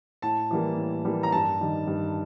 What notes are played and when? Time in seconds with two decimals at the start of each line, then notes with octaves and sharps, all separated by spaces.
0.22 A2 A5
0.51 E3 G3 A#3
0.77 A2
1.05 E3 G3 A#3
1.23 A#5
1.32 G2 A5
1.61 D#3 G3
1.87 G2